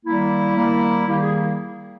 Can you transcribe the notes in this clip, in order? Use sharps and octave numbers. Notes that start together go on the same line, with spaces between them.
D#3 G3 A#3 E4
D#3 G3 A#3
D#3 G3 A#3 G4
G#4